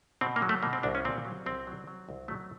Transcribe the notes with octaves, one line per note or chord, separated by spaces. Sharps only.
B2 C4
A#3
F#3
A3
B2 A#3
C4
C2 D4
C#4
A#2 C4
F#3
C2 C4
F#3
F#3
C2
F#3 A3